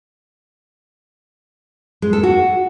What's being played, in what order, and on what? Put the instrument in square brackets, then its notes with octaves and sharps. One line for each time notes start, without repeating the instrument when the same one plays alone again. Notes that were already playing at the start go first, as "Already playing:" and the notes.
[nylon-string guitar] G#3
A4
F#4